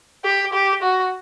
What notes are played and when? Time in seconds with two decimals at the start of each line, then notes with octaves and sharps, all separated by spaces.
0.25 G4
0.53 G4
0.82 F#4